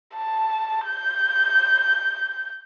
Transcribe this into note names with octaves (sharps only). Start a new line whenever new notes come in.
A5
G6